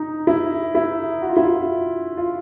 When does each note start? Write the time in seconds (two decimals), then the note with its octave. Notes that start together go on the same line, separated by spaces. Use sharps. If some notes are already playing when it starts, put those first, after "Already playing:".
Already playing: D#4
0.27 E4
0.75 E4
1.22 F#4
1.29 F4
1.37 E4
1.44 F4
2.17 F4